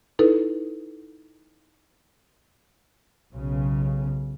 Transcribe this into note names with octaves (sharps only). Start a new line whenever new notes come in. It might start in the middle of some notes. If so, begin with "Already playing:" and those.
D#4 E4 A4 B4
B1 C#3